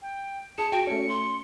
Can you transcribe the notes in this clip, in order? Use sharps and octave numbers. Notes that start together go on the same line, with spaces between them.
G5
G#4 A5 C#7
F#4 G5 D7
A3 C#4 C#7
C6